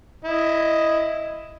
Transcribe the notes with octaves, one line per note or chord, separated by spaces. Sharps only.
E4 D#5